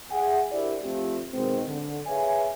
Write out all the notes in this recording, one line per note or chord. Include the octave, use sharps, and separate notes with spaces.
G#4 E5 F#5 G#5
D4 E4 G4 A#4 C5 D5
F3 A3 C4 F4 G4
B2 D#3 G#3 C4
D3
G#4 B4 C#5 E5 F5 G#5